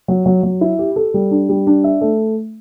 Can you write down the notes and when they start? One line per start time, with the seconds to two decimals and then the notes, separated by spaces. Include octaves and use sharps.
0.08 F#3
0.26 F#3
0.43 F#3
0.61 E4
0.79 G4
0.96 A4
1.14 G3
1.31 D4
1.49 G3
1.67 D4
1.84 E5
2.01 A3